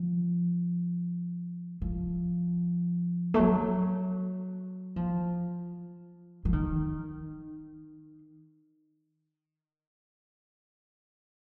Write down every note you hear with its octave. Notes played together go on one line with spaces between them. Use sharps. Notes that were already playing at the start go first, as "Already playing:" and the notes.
Already playing: F3
F3
A3
F#3
F3
F3
D#3